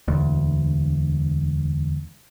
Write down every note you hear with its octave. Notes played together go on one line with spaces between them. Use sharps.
E1 D2